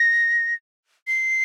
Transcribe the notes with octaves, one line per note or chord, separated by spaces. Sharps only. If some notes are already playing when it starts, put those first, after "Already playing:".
Already playing: A#6
C7